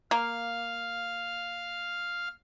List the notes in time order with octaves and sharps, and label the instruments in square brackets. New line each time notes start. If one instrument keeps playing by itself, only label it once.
[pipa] A#3 [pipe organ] F5